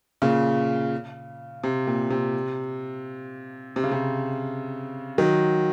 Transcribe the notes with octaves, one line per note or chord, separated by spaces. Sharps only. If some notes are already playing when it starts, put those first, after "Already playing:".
A#2 C#3
C3
A#2
C3
C3
C#3
C3
D#3 F#3